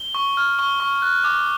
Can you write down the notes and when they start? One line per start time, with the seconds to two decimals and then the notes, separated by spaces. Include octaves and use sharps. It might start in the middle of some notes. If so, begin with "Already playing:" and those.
Already playing: G7
0.15 C#6
0.37 F6
0.59 C#6 G7
0.80 C#6
1.02 F#6
1.24 D6